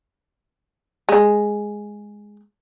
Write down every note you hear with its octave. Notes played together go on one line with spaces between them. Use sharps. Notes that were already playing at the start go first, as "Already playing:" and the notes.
G#3